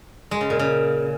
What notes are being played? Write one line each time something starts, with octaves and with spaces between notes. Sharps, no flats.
G#3
C#3
A#2
C#3